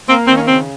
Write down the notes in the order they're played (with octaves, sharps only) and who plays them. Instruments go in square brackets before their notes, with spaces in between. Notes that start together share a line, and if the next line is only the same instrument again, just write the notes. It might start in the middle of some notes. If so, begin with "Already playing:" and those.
[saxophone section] A#3 C4
D#3 C4
C#4
C#3 C4